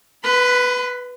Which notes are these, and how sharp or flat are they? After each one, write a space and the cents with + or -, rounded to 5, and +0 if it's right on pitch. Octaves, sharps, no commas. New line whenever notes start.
B4 +0 B5 +45